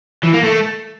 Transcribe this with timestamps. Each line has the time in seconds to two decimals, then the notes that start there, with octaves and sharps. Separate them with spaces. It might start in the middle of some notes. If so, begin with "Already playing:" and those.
0.23 E3
0.33 A#3
0.43 A3